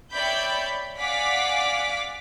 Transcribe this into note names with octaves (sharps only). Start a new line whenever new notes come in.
C#5 D5 E5 G5 B5 G6
D5 F5 F#5 G#5 D6 B6